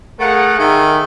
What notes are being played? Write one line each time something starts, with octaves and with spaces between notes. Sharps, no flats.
A3 G#4 A#4 F5 F#5
D#3 G#4 E5